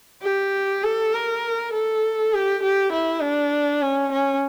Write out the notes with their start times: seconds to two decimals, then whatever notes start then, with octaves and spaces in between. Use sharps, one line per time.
0.22 G4
0.83 A4
1.13 A#4
1.73 A4
2.33 G4
2.62 G4
2.92 E4
3.22 D4
3.81 C#4
4.12 C#4